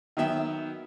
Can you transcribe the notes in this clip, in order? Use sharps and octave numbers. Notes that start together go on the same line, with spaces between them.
D#3 F#3 B3 E5 G5